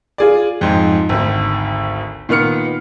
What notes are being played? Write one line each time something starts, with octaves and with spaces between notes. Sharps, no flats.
F4 G#4 D5
F2 G#2
G#1 D2
A#2 D#3 B3 F6 C#7